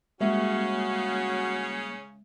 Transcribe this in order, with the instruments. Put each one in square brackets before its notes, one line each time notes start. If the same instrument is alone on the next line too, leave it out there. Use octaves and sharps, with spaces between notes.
[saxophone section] C#3 C#4 [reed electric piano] G3 A#3 [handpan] G#3 E5 [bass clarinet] F#4